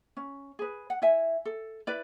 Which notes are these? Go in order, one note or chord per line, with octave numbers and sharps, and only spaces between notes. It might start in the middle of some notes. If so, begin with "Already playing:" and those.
C#4
G#4 B4
F#5
E4 E5 G#5
A4
E4 B4 D5